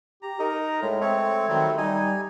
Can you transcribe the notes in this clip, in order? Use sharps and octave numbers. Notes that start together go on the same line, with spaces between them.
G4 A#5
D#4 A#4
A2 G#3
A3 C4 C#5
D#3 F#3 G3 C4
G3 D#4 G#5